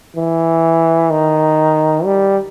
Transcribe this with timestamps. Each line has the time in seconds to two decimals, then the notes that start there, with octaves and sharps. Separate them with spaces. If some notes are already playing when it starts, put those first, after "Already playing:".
0.16 E3
1.10 D#3
2.04 G3